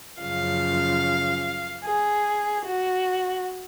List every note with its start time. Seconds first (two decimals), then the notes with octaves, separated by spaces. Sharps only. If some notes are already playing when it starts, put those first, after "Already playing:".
0.20 F#2 C#3 F3 F5
1.83 G#4
2.65 F#4